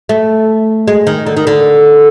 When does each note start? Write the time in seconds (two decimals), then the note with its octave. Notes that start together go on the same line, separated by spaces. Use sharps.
0.09 A3
0.88 G#3
1.07 D#3
1.27 D3
1.37 D#3
1.47 D3